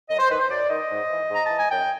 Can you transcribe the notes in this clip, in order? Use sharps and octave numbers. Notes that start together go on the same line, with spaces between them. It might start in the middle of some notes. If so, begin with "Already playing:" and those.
F#2 D#5
C5
D#3 B4
C5
F#2 D5
D#3 D#5
G#2
E3
G#2 A#5
E3 A5
G#5
F#2 G5